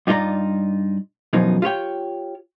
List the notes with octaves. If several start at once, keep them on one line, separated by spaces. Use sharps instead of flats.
G2 D#4 F4 A4 D5 A#5
F#2 B2 E3 F3 D#4
F4 G4 C#5 G5